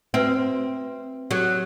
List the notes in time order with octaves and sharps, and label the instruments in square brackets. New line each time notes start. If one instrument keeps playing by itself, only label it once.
[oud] C4 [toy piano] F#4 B4 E5
[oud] F#3 [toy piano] G4 A4